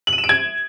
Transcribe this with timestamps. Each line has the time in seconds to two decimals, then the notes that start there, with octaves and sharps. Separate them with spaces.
0.07 F#7
0.13 D#7
0.18 E7
0.24 D7
0.29 G#6